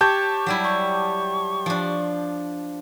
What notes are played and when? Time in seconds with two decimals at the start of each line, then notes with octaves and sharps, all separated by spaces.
0.01 G4 C#5 A5 C#6 G6
0.46 F#3 G3 E4
0.64 C#6
1.66 F3 D4